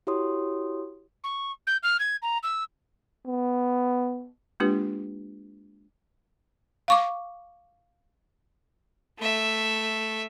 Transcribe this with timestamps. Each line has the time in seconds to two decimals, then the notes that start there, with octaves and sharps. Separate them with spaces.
0.07 E4 F#4 G4 C#5 C6 D#6
1.24 C#6
1.67 G6
1.83 F6
1.99 G#6
2.22 A#5
2.43 E6
3.27 B3
4.60 G#3 A#3 D4 F4 G4 B4
6.88 F5 C#6 D6
9.19 A3 E5